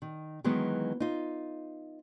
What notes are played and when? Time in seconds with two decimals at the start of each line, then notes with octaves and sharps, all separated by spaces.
0.02 D#3
0.44 D#3 E3 F#3 G#3 B3
1.00 D#4 F4